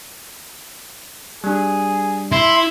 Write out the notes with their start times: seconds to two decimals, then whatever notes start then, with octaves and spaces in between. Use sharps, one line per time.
1.44 G3 D4 G#4
2.32 E4 E5 C6